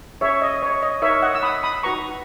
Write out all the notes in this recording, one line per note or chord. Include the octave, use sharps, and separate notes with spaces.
C#4 G#4 C#5 E5
D#5
C#5
D#5
D#4 A#4 C#5 E5
D#5 F#5
E6
B5 D#6
B5 D#6
D#4 F#4 B4 A#5 C#6